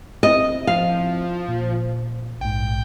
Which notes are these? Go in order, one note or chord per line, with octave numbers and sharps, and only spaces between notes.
C4 E4 D#5
F3 F5
A#2
A#1 G#2 G5